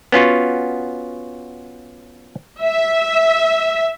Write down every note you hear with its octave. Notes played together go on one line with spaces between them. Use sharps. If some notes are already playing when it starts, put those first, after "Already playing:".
B3 C#4 F4 F#4
E5